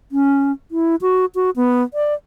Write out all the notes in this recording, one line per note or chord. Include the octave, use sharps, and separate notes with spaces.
C#4
E4
F#4
F#4
B3
D5